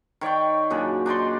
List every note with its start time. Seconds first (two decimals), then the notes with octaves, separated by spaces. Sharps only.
0.21 D#3 C#5 D5 G5
0.70 F#2 A#2 D4 G#4
1.06 D4 D#4 D5 C6